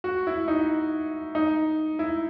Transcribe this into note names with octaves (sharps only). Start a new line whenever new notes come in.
F#4
E4
D#4
D#4
E4